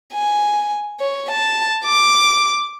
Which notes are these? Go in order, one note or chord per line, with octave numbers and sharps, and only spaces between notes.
G#5
C#5
A5
D6